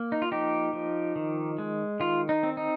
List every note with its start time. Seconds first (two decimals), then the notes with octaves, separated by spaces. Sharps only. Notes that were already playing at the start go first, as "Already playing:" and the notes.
Already playing: A#3
0.12 D#4
0.22 F4
0.31 F3 D#4 G4
0.73 F3
1.16 D#3
1.59 G#3
2.00 D#3 F4
2.29 D#4
2.43 C4
2.57 D#4